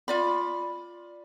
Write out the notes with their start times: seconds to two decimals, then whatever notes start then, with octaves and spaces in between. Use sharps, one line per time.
0.08 F4 D5 B5